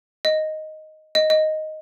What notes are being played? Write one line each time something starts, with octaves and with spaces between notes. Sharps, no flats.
D#5
D#5
D#5